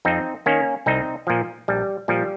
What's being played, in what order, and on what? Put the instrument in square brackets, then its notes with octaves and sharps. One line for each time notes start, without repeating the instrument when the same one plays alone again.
[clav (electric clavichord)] F2 C4 D#4
D#3 A#3 C#4
C2 C4 D#4
A#2 F3
A#1 G3
A#2 F3 G3